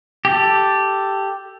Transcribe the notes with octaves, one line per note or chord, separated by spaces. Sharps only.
G4 A4